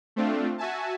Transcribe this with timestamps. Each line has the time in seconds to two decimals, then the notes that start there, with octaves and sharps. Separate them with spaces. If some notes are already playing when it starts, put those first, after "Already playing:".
0.16 A3 C4 D4 F4
0.58 F#4 E5 G#5 A5